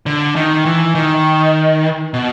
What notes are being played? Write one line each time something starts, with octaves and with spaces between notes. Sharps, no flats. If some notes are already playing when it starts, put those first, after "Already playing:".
D3
D#3
E3
D#3
B2